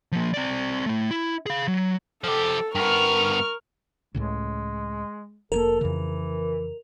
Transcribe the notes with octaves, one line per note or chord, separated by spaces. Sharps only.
F3 A#3
C4 D5
A2 A3
E4
G#4 F5
F#3
F3 G4 A4
G2 B3 A#4 C#6 F6
C#2 A2 C#3 G#3
F1 B2 A#3 A4 A#4
F2 C#3 E3